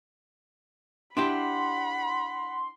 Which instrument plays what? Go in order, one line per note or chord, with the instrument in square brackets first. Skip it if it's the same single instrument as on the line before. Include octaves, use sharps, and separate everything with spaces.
[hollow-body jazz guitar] D4 E4 G4 [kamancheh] F#5 B5 [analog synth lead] C6